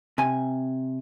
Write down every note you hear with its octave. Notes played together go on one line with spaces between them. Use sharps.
C3 G#5